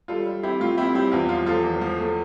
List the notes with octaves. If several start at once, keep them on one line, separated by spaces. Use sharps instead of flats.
G3 F4 A4
G3
C4 E4 G4
A2 F4
C4 E4 G4
G3 E4 G4
E2 F4
F3 F4
F3 F4 A4
E2
F3
A3